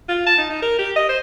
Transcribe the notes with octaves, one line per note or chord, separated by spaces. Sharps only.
F4
A5
D#4
D#4
A#4
G4
D#5
C5